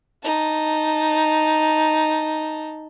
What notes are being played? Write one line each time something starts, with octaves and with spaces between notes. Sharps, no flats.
D#4 A5